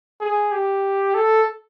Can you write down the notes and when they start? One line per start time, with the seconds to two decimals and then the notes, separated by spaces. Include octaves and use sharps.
0.20 G#4
0.52 G4
1.14 A4